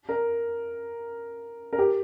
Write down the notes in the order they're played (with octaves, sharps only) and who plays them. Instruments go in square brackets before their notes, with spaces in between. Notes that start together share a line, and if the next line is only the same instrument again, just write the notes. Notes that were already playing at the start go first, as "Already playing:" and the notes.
[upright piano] A#4
A#4
G4